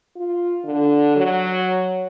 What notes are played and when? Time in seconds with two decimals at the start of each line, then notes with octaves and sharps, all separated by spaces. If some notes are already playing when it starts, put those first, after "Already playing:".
0.16 F4
0.64 D3
1.16 F#3